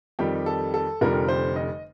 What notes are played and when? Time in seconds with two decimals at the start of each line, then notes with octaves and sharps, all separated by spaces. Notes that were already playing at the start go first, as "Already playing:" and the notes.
0.19 F2 D#3 G3 G4
0.46 A4
0.74 A4
1.01 F1 F2 D3 G3 A#4
1.28 C5
1.56 D#5